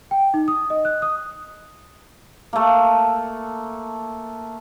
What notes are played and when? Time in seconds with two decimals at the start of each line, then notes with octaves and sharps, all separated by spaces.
0.11 G5
0.34 D#4
0.48 D#6
0.70 D#5
0.85 F#6
1.02 D#6
2.53 A3 A#3